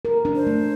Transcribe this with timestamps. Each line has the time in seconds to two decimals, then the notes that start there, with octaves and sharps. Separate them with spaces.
0.05 A#4
0.25 D4
0.36 C5
0.47 A3